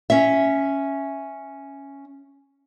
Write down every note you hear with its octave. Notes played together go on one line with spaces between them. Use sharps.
C#4 E5